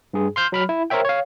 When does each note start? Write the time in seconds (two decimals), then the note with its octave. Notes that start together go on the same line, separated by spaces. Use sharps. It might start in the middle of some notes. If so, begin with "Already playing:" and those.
0.13 G2 G#4
0.36 C6 F6 G6
0.52 F#3 B5 F6
0.69 E4
0.90 A#4 C5 C#5 E5 G5
1.05 C#5 F5